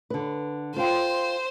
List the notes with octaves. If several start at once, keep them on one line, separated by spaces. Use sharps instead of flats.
D3 B4
F4 C5 F5 G5